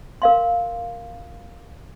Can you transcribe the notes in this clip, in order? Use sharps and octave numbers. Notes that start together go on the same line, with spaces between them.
A#4 F5 C6